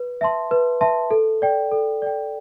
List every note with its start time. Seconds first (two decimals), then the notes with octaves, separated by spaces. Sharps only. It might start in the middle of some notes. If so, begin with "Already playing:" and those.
Already playing: B4
0.21 E5 A5 C6
0.51 B4
0.81 E5 A5 C6
1.11 A4
1.42 D5 G5
1.72 A4
2.02 D5 G5